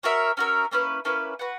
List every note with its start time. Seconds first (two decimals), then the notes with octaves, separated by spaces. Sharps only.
0.03 C#4 F#4 A#4 E5
0.37 C#4 F#4 A#4 E5
0.71 A#3 C#4 E4 B4
1.05 A#3 C#4 E4 B4
1.39 F#4 B4 F#5